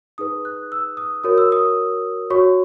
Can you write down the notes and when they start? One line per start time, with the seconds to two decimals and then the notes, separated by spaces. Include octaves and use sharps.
0.18 D#4 G#4 B4 D#6
0.45 F#6
0.72 E6
0.97 D#6
1.24 F#4 A#4 C#5 D#6
1.38 E6
1.52 D#6
2.30 F#4 C#5 C#6